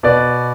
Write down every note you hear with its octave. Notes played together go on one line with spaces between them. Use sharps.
B2 B4 D5